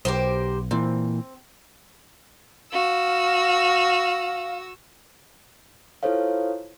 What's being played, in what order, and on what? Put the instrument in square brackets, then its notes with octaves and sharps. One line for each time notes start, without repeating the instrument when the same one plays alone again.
[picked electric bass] B1 [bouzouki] G4 A#4 C5
[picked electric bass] A#2 E3 [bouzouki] C4
[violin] F#4 E6 [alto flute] F5
[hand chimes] E4 F4 A4 C5 C#5 F5